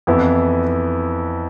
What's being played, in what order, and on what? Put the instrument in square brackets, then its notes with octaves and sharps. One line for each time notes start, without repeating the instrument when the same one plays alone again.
[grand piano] F2 E3 B3 E4